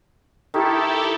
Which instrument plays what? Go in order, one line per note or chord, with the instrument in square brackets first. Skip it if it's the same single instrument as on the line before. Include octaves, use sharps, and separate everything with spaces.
[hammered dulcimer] D#3 [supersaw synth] E4 G4 A4